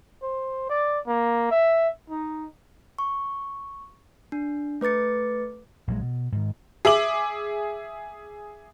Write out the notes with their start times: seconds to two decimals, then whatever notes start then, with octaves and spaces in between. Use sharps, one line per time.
0.22 C5
0.69 D5
1.07 A#3
1.51 E5
2.10 D#4
2.99 C#6
4.32 D4
4.81 A3 B4 D6 A6 C#7
5.88 A#1 A#2 F#3 G#3
6.01 B2
6.32 G#2 D#3
6.85 G#4 E5 D6 F#7